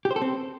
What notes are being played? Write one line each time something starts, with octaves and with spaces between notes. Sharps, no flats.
G4
C5
A4
C4